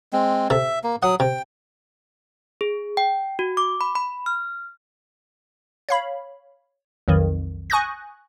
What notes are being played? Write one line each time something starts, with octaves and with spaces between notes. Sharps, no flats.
G#3 C4
C3 A4 E5
A#3
F#3 F#5 D#6
C3 G5
G#4
G5
F#4
D6
B5
B5
F6
C#5 F5 B5
B1 F2 D#3
G#5 C#6 D#6 F#6 G6 A#6